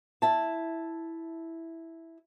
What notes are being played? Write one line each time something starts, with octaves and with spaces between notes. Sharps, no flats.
E4 A5